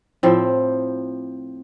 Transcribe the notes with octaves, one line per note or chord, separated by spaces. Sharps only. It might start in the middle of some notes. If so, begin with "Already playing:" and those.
A2 F3 C4